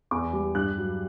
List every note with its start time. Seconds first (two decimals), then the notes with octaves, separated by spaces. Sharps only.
0.11 E2 D6
0.33 G3
0.55 G2 F#6
0.78 F#3